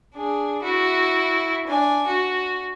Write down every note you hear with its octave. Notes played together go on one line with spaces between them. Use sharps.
D4 G#4
E4 F#4
D4 G#5
F#4